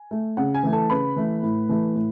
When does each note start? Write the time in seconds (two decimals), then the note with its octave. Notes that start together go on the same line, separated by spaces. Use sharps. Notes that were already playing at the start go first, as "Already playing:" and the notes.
Already playing: G#5
0.11 A3
0.37 C#3 F#5
0.54 G#5
0.63 E3 A3
0.73 A4 A5
0.90 C#3 B4 B5
1.16 E3 A3
1.43 A2
1.69 E3 A3
1.95 A2